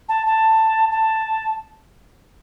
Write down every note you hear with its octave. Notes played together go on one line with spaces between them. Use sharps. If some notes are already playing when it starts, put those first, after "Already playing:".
A5
A5
A5